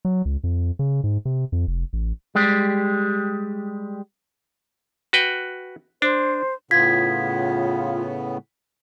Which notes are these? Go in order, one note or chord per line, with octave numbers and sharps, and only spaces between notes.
F#3
C#2
F2
C#3
G#2
C3
F2
F1
A1
G3 G#3 G4
F#4 B4 G5
D4 C5
A2 C#3 B3 F4 G#6 B6